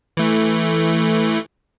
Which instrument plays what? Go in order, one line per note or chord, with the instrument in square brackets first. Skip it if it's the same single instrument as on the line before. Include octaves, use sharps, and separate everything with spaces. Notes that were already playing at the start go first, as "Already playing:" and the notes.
[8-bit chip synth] E3 A3